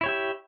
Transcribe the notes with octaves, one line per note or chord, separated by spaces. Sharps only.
E4 G4 C#5 E5